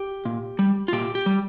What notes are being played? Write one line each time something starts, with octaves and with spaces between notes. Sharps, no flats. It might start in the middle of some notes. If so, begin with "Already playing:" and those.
Already playing: G4
A#2
G3
F4
A#2 G4
G4
G3